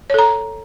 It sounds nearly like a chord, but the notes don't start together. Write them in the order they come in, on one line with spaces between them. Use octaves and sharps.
C#5 A4 A#5